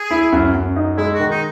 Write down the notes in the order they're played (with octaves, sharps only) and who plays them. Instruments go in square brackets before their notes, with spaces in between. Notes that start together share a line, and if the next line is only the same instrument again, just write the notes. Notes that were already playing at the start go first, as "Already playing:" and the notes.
Already playing: [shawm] G#4
[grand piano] E4
F#2
F#2
D#4
[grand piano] G#3 [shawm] E4
[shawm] F#4
[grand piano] D#3
[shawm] D#4